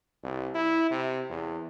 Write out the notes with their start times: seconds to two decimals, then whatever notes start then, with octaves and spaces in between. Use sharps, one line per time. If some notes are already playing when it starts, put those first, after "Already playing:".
0.24 C2
0.55 E4
0.91 C3
1.30 E2